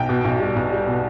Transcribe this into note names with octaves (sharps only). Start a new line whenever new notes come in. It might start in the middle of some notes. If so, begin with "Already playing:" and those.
Already playing: B1 G5
B2
B1
G3
B1
G3
B2